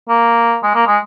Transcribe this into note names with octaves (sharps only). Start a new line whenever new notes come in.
A#3
G#3
A#3
G#3